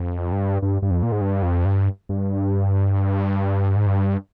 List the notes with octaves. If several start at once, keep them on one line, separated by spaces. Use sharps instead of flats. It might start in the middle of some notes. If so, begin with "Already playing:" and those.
Already playing: F2
G2
G2
G2
F2
A#2
G#2
G2
F2
G2
G2
G#2
G2